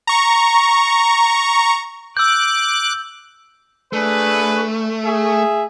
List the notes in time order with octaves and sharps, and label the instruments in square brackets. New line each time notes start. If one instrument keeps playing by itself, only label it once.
[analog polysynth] A#5 C#6
[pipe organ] D6 F#6 [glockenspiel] E6 G6
[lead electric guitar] A3 [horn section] D4 G#4 B4
[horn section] G#4 E5